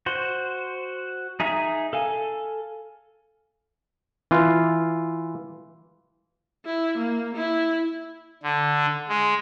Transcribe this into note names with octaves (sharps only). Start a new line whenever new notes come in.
F#4 C5
D#4 G#4 E5 A#5 D#6
A4 F5 G#5
E3 F4
E4
A#3
E4
D3
G#3